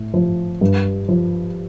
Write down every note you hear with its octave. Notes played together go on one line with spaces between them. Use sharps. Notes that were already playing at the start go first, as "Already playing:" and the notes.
Already playing: A2
F3
G2
F3